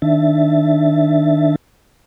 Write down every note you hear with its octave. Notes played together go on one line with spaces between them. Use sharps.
D#3 D4 E5 A6